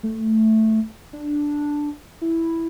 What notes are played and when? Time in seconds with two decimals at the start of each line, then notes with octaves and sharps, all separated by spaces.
0.03 A3
1.13 D4
2.21 E4